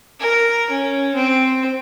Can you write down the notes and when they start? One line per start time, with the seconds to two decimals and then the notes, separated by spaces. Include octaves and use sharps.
0.20 A#4
0.70 C#4
1.15 C4